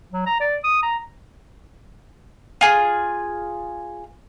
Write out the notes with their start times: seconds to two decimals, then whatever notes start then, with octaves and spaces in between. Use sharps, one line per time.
0.12 F#3
0.26 A#5
0.40 D5
0.64 D#6
0.83 A#5
2.61 F4 G#4